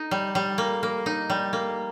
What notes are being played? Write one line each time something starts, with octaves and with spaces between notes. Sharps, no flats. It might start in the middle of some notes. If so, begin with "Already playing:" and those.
Already playing: D#4
G3
G3
A#3
A#3
D#4
G3
A#3